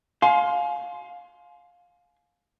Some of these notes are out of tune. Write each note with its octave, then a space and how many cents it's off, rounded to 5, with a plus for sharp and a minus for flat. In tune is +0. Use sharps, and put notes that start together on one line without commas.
F5 +20 G#5 +35 C6 +0